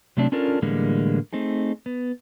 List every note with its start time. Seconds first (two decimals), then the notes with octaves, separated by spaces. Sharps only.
0.17 C3 F#3 A3 C4 D4
0.32 C#4 D4 F4 A4 A#4
0.62 A2 D3 E3 G3 G#3 A#3
1.33 A3 C4 D#4 G#4
1.86 B3